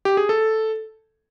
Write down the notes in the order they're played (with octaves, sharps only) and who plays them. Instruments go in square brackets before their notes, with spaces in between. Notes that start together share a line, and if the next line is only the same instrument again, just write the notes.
[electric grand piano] G4
G#4
A4